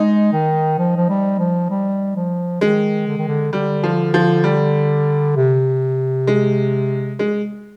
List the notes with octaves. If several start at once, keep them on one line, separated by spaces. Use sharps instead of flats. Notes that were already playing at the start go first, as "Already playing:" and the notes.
Already playing: G#3 D#4
D#3
F3
F3
G3
F3
G3
F3
D#3 G#3
D3
D#3
D3
D3 G3
F3
F3
G3
C3
G#3
G#3